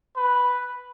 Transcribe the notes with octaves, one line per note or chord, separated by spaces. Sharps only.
B4